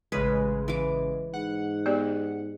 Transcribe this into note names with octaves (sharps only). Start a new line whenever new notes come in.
A1 C#3 G#3 B4
E3 D6
G#2 F#5
B3 G4 D5